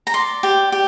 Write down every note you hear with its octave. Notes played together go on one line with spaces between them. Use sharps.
A#5
D5 C6
G4
G4